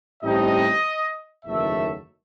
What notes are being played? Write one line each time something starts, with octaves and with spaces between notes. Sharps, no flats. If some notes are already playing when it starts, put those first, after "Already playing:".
A1 A2 G3 C4 D#4 D#5
F#1 E2 D#3 F#3 A3 E5